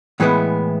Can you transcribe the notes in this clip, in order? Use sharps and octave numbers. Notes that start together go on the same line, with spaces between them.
A2 E3 G#3 B3 E4